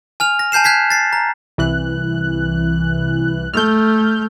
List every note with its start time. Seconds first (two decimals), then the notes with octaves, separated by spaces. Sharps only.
0.20 G#5 F6 F7
0.39 A#6
0.52 G#5 A5 G6 C7 E7
0.64 F#6 G#6 B6 C7
0.90 A6 C7
1.13 A#5
1.58 C2 E3 F#6
3.54 A3 F6 G6